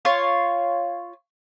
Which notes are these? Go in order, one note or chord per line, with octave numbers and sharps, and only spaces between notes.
F4 C#5 C6